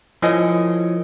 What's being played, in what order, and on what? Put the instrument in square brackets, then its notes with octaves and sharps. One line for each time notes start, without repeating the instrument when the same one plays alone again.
[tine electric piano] F3 [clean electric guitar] E4 A#4 C#5 [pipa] G#4 D#5